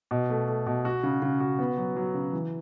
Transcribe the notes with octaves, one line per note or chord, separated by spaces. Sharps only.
B2
A3
A3
B2
F#4
C#3
C#3
F#4
B3
F#3
F#3
C#3
E3